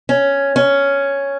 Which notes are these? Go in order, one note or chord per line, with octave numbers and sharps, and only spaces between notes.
C#4
C#4